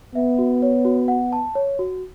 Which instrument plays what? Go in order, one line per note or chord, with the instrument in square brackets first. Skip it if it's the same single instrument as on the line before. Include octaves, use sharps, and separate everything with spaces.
[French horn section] B3 [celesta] E5
[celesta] F#4
C#5
F#4
F#5
A5
C#5
F#4